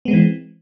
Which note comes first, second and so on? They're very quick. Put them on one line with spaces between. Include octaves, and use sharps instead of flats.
B3 G#3 C4 E3